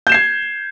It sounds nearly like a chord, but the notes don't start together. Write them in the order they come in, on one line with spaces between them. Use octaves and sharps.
G6 E7 C7 G#6